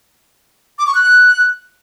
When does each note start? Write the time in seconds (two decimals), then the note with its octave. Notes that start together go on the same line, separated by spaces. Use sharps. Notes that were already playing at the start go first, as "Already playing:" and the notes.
0.79 D6
0.87 C#6
0.95 F#6